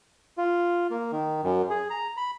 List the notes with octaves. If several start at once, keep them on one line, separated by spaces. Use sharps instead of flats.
F4
A#3
D#3
F#2
G#4
A#5
B5